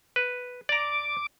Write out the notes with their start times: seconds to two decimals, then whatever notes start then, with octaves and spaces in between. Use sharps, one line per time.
0.16 B4
0.69 D5 A#5 D6